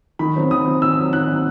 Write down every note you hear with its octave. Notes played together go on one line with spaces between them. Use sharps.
D#3 B5
F#3 C4
D#3 D#6
F#3 C4
D#3 E6
F#3 C4
D#3 F#6
F#3 C4